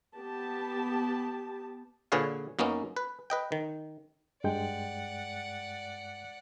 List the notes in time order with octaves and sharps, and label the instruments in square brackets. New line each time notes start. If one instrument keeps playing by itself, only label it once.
[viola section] B3 G4 A5
[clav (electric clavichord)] A#2 D3 G#4 B4 C#5 F5
F#2 A#3 B3 C#4 D#4
B4
B4 D#5 G5
D#3
[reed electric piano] G2 G#3 G5 [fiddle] D5 F#5